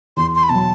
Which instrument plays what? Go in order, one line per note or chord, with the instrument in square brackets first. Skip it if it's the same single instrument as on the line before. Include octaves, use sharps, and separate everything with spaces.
[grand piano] E2 [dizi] C6
[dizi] C6
B5
[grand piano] B2 F#3 [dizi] A5